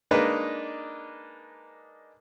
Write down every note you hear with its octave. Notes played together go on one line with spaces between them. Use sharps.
G#3 A#3 D4 D#4 B4